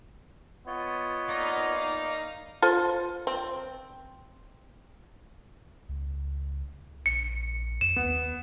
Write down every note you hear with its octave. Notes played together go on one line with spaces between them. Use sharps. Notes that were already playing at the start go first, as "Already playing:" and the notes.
B3 F4 C#5 D#5
A#3 D#4 D5 F5
F4 A4 C5
C4
C#2
A#1 C#7
F2 E7
D#2 B3